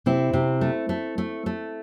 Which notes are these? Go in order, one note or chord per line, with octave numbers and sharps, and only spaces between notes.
C3 C4 E4
C3
A3
A3
A3
A3